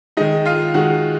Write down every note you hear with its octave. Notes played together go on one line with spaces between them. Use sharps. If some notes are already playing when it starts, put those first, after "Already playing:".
D#3 G#3 D#4 D#5
F4 F5
D#3 G#3 F#4 F#5